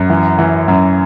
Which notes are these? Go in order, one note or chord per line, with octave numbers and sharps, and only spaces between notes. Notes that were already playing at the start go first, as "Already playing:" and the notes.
Already playing: F#2
E3
E3
F#2